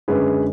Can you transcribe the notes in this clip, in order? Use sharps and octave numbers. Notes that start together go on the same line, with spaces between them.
F#2 D3 G#3 C#4 G#4 B4